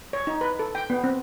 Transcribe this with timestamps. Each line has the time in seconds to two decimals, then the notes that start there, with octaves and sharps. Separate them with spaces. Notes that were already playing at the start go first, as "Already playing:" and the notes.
0.13 C#5
0.27 D#4
0.41 B4
0.59 A4
0.75 G5
0.90 B3
1.04 C4